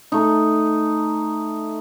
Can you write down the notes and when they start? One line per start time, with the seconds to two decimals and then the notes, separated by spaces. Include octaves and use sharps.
0.12 A3 D#4